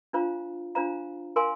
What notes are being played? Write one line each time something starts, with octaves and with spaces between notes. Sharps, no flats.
D4 F4 C5 F5 A#5
D4 F4 C5 F5 A#5
A#4 F5 G#5 C6